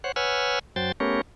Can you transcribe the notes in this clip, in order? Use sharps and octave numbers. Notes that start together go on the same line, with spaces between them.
C5 C#5 F#5
B4 C#5 F#5 G#5 E6 F6
F#2 F#3 C5 G5 A6
A3 B3 C#4 G4 A#4 C#5